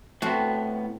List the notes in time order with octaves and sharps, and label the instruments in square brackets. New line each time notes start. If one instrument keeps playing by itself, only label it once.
[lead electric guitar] A2 B3 [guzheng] C4 F#4 A4